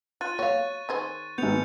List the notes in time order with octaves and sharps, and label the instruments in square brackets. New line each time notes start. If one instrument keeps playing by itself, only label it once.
[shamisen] F4 [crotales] F#6 A6 D#7
[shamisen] F#4 F5 [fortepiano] C#5 [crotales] C#6
[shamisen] D#3 G#4 C5
[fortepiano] G#1 B3 [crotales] G6 C#7 F7